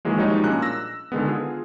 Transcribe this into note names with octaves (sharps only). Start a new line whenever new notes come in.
D#3 E3 F#3 G#3 A#3
F3 G3 G#3 D#4 F#4 C#5
A#2 C#4 D4 A#5 F#6
E6 A#6
D3 D#3 G#3 B3
F4 G#4